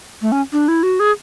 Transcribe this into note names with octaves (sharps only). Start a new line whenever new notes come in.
A3
C#4
D4
E4
F#4
G#4